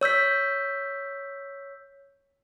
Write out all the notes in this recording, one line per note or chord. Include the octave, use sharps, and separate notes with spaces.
C#5 E6 G6 B6